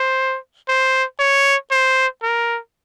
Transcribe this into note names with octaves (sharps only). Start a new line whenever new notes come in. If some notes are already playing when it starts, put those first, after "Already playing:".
Already playing: C5
C5
C#5
C5
A#4